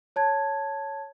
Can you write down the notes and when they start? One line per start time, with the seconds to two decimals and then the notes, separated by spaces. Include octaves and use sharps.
0.16 C#5 A5 G#6